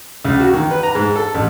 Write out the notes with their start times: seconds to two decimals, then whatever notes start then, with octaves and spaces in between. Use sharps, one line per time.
0.25 C#2
0.40 F#4
0.53 D#3
0.71 B4
0.83 A#5
0.95 G#2
1.15 A4
1.34 A1